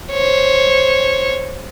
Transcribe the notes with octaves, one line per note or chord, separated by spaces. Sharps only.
C5 C#5